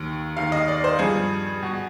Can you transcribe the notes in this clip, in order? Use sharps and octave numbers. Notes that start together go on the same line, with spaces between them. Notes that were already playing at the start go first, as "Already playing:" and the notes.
Already playing: D#2 D#3
D#2 D#3 F5
D#5
D5
C5
G2 F3 G#4
B2